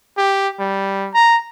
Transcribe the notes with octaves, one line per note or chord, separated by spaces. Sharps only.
G4
G3
A#5